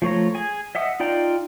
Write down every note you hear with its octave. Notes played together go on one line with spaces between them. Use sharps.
F3 A3 C#5 A#5
G#4 G#5
D#5 E5 F#5 D#6
D#4 F4 D5 G5 A#5